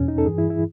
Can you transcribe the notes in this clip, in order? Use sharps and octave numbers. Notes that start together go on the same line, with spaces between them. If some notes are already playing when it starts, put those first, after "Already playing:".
Already playing: E2 B2 C#4
D#4
A4
G2 E3 G#4
E4
E4